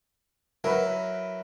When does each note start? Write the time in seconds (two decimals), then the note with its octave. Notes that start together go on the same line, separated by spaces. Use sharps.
0.64 F#3 E4 A#4 B4